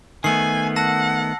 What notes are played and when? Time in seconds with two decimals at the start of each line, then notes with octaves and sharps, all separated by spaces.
0.24 D#3 A3 B3 G#5 C7 F#7
0.76 F#5 A5 E6 A#6